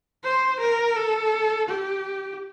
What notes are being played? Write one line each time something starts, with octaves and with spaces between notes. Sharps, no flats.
C5
A#4
A4
G4